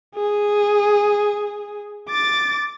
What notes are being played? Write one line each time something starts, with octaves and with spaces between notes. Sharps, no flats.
G#4
D6 A6